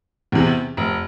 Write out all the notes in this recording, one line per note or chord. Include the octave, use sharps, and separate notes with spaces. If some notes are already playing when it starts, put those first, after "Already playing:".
E2 C3
F1